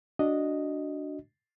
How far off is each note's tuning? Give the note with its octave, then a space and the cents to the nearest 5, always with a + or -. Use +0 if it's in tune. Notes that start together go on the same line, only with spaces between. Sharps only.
D4 +0 F#4 +0 D#5 +0